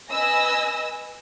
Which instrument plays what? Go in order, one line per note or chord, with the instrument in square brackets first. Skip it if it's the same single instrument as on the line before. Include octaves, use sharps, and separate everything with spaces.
[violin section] B4 D#5 G#5 E6 A#6